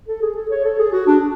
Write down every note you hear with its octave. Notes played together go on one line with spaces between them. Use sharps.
A4
G#4
A4
C#5
A4
G#4
F#4
D4